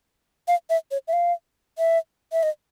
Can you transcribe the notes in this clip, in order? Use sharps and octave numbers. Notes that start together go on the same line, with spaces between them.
F5
E5
C#5
E5
F5
E5
E5
D#5